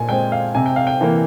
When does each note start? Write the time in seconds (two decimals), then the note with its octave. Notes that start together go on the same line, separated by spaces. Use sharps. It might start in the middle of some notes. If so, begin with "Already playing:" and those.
Already playing: A#2 G#5
0.09 G#3 C4 G5
0.32 F5
0.55 C3 G#5
0.66 G5
0.76 F5
0.87 G5
1.01 E3 A#3